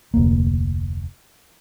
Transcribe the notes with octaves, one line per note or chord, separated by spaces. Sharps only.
F1 D2 A#3